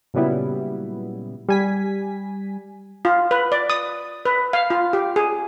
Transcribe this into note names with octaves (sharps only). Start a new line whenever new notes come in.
A#2 C#3 F#3 G3 B3 E4
G3 G#5 B6
F4
B4
D5
D#6
B4
F5
F4
G4
G#4